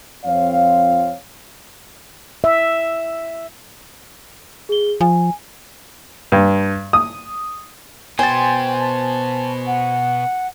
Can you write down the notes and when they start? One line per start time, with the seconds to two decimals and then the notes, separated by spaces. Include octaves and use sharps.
0.25 F2 C4 F4 C#5 F5
2.44 E5
4.69 G#4 G7
5.01 F3 G#5
6.32 G2
6.93 D#6
8.19 B2 B3 C5 G5 G#5 A6
8.80 A5
9.67 F#5